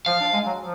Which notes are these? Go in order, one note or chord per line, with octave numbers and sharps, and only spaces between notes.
F3 F5
D4
G#3
F#3
F3